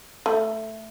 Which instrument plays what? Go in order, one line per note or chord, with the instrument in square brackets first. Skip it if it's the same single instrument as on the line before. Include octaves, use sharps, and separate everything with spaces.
[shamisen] A3